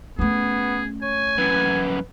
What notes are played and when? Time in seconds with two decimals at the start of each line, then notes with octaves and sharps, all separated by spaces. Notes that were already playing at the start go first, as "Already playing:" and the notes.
0.19 A3 B3 C#4 G#4
1.02 C#5 G#5
1.38 F#2 E3 B4